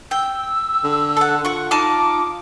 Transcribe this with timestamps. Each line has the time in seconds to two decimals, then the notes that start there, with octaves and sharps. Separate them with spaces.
0.11 G5 E6
0.84 D3
1.17 A4 F#5
1.45 F4 F#5 C#6
1.71 D#4 A5 D6 F6